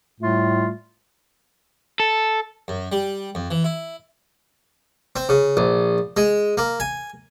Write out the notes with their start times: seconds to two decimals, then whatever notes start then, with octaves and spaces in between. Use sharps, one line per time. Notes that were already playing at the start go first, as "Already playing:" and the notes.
0.21 A2 G3 A3 F4
2.00 A4
2.68 F#2
2.92 G3
3.35 F2
3.51 E3
3.64 E4
5.16 C4
5.29 C#3
5.57 A#1
6.17 G#3
6.58 A#3
6.80 G#5